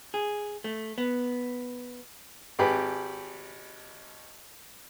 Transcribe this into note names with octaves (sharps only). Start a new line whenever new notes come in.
G#4
A3
B3
G#1 G4 G#4 B4 B5